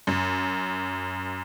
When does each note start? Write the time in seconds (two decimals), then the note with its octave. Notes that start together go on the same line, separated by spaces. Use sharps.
0.07 F#2